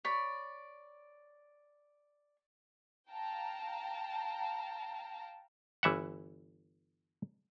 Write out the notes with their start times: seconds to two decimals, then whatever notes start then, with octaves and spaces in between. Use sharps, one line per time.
0.05 C#5 D5 B5
3.09 F5 G5 A5 A#5
5.83 G1 E3 E5 F#5